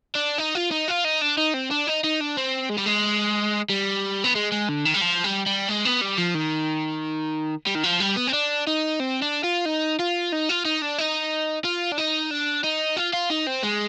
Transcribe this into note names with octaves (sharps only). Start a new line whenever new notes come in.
D4
D#4
F4
D#4
F4
D#4
D4
D#4
C4
D4
D#4
D#4
D4
C4
G#3
G3
G#3
G3
B3
G#3
G#3
D3
D#3
G3
F3
G3
G3
G#3
B3
G3
F3
D#3
G3
D#3
F3
G3
B3
C4
D4
D#4
C4
D4
F4
D#4
F4
D#4
F4
D#4
D4
D#4
F4
D4
D#4
D4
D#4
F4
F4
D#4
C4
G#3